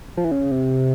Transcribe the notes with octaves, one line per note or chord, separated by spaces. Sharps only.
F3
E3
C#3
C3